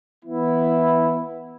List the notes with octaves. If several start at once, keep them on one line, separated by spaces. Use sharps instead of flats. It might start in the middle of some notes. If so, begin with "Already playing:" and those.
E3 B3 E4